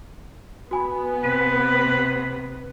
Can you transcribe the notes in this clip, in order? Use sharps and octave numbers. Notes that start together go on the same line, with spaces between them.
B3 F#4 G#5 B5
C3 B4 D#7